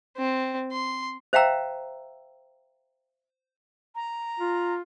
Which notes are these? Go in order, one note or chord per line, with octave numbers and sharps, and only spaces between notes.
C4
C6
C5 E5 F5 G5 A#5 E6
A#5
F4